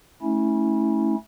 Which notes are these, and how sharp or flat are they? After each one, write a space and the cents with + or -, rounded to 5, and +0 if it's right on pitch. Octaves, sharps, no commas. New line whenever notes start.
A3 -10 C#4 -5 E4 -25